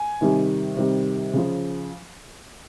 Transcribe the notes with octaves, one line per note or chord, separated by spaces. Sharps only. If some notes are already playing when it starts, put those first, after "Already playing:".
Already playing: G#5
C3 D#3 G3
C3 D#3 G3
C#3 F3